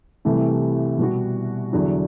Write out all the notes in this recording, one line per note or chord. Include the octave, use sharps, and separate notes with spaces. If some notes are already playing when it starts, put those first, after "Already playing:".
C2 C3 E3 A3
B2 G3 B3 F#4
E2 D3 F#3